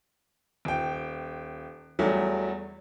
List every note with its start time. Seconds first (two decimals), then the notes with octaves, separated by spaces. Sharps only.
0.65 D#1 G5
1.99 E2 F#3 G3 A3